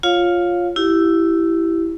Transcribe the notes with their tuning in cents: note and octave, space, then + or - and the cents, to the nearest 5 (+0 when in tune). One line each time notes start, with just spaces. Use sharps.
F4 +0 C#5 +0 F5 +20
E4 +5 G4 -20